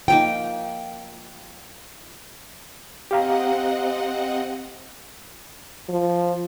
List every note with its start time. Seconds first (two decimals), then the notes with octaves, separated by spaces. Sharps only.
0.08 F3 A#3 D#4 G5
3.11 C4 G4 D#5 F5 F#5 A#5
5.89 F3